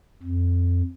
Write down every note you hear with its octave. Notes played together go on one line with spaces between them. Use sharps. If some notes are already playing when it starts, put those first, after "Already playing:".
F2